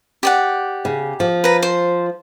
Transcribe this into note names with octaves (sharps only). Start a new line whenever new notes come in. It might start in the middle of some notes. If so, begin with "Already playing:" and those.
G4 D5 F#5
C#3
F3
B4 A#5
C5